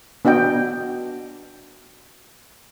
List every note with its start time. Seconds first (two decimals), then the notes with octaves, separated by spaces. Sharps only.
0.25 B3 D4 F#4 D#5 G5